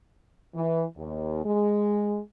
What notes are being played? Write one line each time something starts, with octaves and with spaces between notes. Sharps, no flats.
E3
D#2
G#3